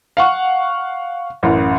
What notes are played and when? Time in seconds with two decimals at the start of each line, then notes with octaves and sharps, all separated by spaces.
0.17 F5 F#5 C#6
1.43 A1 F#2